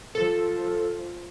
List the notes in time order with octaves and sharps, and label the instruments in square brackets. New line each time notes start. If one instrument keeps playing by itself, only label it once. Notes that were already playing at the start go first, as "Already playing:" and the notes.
[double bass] F3 [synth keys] A4